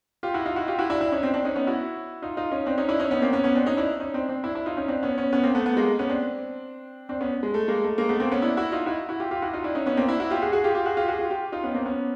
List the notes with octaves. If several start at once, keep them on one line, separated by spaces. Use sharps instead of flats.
F4 G4
E4 F#4
D#4 F4
E4 F#4
F4 G4
E4 F#4
D4 E4
D4 E4
C#4 D#4
C4 D4
C4 D4
C#4 D#4
B3 C#4
E4 F#4
D#4 F4
D#4 F4
C#4 D#4
C4 D4
C#4 D#4
D4 E4
C#4 D#4
B3 C#4
A#3 C4
B3 C#4
B3 C#4
C4 D4
C#4 D#4
D4 E4
C#4 D#4
C4 D4
C4 D4
D4 E4
D4 E4
D#4 F4
C#4 D#4
C4 D4
B3 C#4
B3 C#4
B3 C#4
A#3 C4
A3 B3
A3 B3
G#3 A#3
B3 C#4
C4 D4
C4 D4
B3 C#4
G#3
A3
G#3 A#3
A3
G#3 A#3
A3 B3
A#3 C4
B3 C#4
D4 E4
E4 F#4
D#4 F4
E4 F#4
E4 F#4
F4 G4
F4 G4
E4 F#4
D#4 F4
D4 E4
C#4 D#4
B3 C#4
A#3 C4
D4 E4
E4 F#4
F4 G4
F#4 G#4
F#4 G#4
F4 G4
F4 G4
F#4 G#4
F4 G4
F#4 G#4
F4 G4
F4 G4
D#4 F4
B3 C#4
A#3 C4
B3 C#4